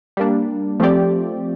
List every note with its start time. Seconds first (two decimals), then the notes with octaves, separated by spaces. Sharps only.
0.17 G3 A#3 D4
0.80 F3 A3 C4 G4 D5